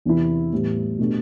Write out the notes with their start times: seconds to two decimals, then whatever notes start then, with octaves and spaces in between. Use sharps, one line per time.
0.05 E2 C3 E3 B3 E4
0.53 A2 E3 G3 B3
0.99 B2 A3 D4 G4